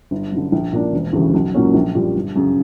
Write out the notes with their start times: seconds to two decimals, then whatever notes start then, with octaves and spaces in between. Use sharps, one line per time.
0.11 G1
0.32 F#2 D3
0.52 A#1
0.72 A#2 A#3 D4
0.93 E1
1.13 D2 C#3 E3 G3
1.34 B1
1.54 A#2 F#3 A#3 C#4
1.74 A#1
1.95 A#2 G3
2.15 G1
2.36 F#2 C#3